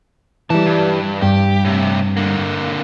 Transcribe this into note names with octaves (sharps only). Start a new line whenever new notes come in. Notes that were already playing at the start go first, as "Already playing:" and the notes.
G#2 E3 G3 A5
G2
G2 G4
A2 C3
D3 A#3